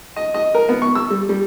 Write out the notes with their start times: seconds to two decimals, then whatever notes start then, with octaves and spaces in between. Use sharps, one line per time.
0.16 D#5
0.34 D#5
0.54 A#4
0.69 B3
0.82 C#6
0.95 E6
1.10 G3
1.29 G3